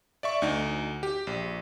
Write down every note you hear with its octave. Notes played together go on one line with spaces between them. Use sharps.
D5 E5 C#6
D2 D#4
G4
A#1